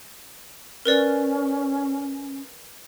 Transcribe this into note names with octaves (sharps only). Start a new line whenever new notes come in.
C#4 A#4 B4 D5